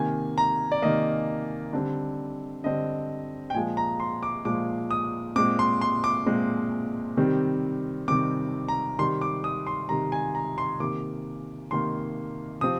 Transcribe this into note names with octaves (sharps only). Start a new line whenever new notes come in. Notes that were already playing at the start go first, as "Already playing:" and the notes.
Already playing: C3 D#3 A#3 G#5
A#5
D5
C3 D#3 A#3 D#5
D3 G3 C4
D3 G3 C4 D#5
G5
A#2 F3 G#3 G#5
A#5
C6
D6
A#2 F3 G#3 D6
D#6
A#2 G#3 C4 D6
C6
C6
D6
A#2 G#3 C4
C3 D#3 G3 C4
C3 D#3 G3 C4 D6
A#5
C3 D#3 G3 C6
D6
D#6
C6
C3 D#3 G3 A#5
G#5
A#5
C6
C3 D#3 A#3 D6
C3 D#3 A#3 C6
C3 F3 C4 D#6